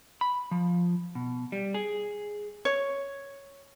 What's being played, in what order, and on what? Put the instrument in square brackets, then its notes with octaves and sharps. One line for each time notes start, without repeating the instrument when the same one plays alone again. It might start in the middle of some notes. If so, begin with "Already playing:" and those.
[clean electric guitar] B5
F3
B2
G3
G#4
[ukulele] C#5